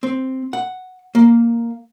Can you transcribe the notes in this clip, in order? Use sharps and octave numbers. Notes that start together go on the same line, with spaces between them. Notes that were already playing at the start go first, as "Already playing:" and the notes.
C4
F#5
A#3